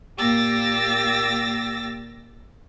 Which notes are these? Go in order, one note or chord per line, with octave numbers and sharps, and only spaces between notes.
A#2 A#3 G4 E6 A6 A#6